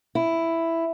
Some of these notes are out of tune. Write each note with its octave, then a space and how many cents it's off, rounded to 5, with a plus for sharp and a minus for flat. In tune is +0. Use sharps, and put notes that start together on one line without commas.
E4 +5